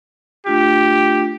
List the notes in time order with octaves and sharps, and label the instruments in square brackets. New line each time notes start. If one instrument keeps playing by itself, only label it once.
[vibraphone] A3 D4 F4 [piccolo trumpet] G4